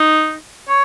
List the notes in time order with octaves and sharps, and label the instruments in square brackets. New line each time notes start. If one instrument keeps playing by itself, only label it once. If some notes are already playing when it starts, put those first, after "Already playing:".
Already playing: [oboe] D#4
C#5